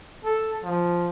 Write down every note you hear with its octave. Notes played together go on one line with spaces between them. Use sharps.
A4
F3